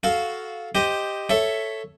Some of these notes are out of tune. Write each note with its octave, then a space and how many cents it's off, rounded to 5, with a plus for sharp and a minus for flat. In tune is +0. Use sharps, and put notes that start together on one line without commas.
F#4 +0 A4 -15 F5 +0
G4 +5 C5 -5 D#5 +5
A4 +0 C#5 +0 E5 +5